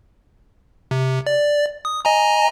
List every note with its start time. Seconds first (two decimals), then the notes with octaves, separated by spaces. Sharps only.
0.91 C3
1.27 D5
1.85 D#6
2.05 D#5 G#5 A#5